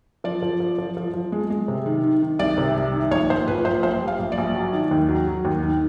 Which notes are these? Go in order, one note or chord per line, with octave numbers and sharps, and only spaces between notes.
F3 D5
F3
F3
F3
F3
F3
G#3
G#3
C3
D#3
D#3
D#3
C2 D5
C3
C2
D#3
A#1 C#5
A#1 C5
A#2 B4
A#1 C5
A#1 C5
G3
F5
A#1
D5
A#1
F#3
D#3
D#2
F#3
F#3
D#2
D#3